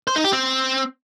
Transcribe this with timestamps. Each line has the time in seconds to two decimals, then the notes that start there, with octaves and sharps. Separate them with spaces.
0.07 C5
0.16 D#4
0.24 G4
0.33 C4